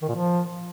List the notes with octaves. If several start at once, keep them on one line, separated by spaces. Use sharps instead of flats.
D#3
A#2
F3